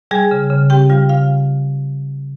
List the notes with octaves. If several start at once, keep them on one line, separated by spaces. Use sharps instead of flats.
G3 G#4 G#5
C#3
C#3
C4 G4 G5
G3 F4 F5
C#3 F4 F5